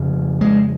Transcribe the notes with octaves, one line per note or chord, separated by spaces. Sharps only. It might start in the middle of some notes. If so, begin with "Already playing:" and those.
Already playing: F2 C#3
G#3